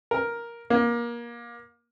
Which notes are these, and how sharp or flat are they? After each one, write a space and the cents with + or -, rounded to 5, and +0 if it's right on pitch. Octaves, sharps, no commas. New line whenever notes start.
A#4 +5
A#3 +25